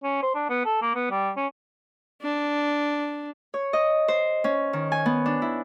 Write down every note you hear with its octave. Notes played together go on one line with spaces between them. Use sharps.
C#4
C5
D4
B3
A4
A#3
B3
G3
C#4
D4
C#5
D#5
C5
C#4
D#3
G#5
B3
D4
E4